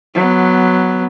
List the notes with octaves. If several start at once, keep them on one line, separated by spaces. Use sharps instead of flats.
F#3 B3